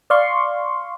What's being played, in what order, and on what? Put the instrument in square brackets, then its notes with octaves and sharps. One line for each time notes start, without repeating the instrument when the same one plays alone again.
[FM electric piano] D5 F5 C6 C#6